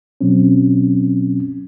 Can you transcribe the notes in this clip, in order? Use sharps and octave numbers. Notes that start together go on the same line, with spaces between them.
B2 F#3 C4 C#4